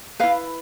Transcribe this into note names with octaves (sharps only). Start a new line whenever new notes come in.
E4 B4 F5